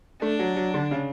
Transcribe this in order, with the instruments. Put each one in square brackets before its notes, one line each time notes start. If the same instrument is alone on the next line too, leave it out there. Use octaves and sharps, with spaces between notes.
[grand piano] A3 [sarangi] D4
[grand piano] F#3
F#3
D3
C#3